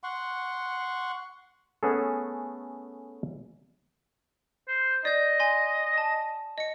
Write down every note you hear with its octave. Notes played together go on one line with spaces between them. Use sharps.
F#5 C6 C#6
A3 B3 C#4 G#4 A4
C5
D5 D#5 G6
G#5 C6
A5
D#5 C#7